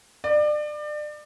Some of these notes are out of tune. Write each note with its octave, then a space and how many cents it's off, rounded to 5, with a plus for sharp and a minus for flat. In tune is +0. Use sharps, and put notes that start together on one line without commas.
D5 +30